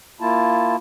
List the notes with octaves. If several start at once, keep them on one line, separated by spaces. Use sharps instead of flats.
A#3 E4 F4 A5